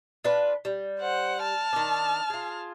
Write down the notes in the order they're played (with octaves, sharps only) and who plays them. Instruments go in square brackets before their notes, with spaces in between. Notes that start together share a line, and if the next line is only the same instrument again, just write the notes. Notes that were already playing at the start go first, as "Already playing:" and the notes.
[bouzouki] D4 F4 B4
G3
[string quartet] C5 F#5
A5 F6
[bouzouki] D#3 D4
F4 G#4